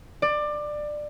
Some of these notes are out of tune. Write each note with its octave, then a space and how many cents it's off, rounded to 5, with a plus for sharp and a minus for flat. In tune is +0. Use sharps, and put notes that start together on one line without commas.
D5 +20